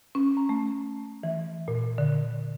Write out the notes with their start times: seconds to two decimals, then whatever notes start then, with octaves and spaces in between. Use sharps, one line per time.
0.15 C#4
0.37 A#5
0.49 A3
1.23 E3
1.68 A#2
1.98 D3